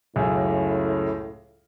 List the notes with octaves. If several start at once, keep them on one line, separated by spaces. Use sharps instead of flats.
C#2 F#2 A2